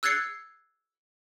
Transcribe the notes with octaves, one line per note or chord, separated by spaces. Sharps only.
E6 F#6 G#6 A6 C7 C#7